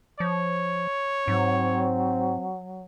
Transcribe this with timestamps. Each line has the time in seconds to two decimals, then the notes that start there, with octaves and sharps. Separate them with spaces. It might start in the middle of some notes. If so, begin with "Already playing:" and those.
0.20 F3 C#5
1.28 G#2 F#3 C4